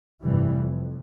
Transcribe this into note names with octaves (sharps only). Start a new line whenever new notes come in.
F1 G2 E3 G3
F2